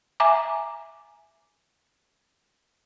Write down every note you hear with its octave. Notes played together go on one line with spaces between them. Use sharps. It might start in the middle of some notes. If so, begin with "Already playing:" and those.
E5 G#5 A#5 D6